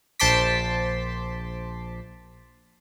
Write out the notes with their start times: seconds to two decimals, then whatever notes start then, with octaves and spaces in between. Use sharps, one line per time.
0.20 A#1 C5 A5 C6 D6 B6